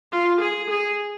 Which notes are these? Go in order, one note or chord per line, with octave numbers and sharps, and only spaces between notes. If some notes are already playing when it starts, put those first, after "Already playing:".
F4
G#4
G#4